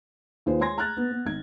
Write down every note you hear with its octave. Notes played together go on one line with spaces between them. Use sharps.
D#2 F4 G#4 B4 C5
G#3 C#5 G#5 C6 G#6 A#6
A#5 F6 F#6 A6
B3
B3
G#1 G#6